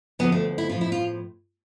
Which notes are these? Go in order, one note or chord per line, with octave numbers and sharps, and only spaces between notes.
D2 D3 F3 B3
A3
E4
A2 F3 F4
E4
F4